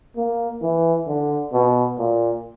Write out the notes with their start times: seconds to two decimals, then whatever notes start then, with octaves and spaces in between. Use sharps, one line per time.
0.16 A#3
0.62 E3
1.07 D3
1.53 B2
1.98 A#2